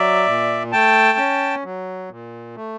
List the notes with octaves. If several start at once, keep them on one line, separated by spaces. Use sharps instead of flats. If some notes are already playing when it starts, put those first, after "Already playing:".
Already playing: F#3 D5 E5
A#2
A3 G5 A5
C#4
F#3
A#2
A3